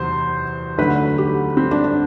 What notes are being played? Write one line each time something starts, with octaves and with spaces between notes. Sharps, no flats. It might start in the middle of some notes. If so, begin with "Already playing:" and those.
Already playing: E2 C3 F#3 C5
D2 D3 F#3 B4
G4
C4
D4
D4